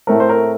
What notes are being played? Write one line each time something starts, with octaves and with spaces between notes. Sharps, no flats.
A2 A3 C4 A#4
C5
A#4